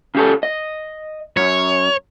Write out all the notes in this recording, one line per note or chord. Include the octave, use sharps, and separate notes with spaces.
C#3 G4 A4
D#5
F#2 C#5